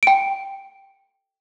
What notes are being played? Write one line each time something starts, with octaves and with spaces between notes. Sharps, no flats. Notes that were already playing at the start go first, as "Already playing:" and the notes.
G5 D7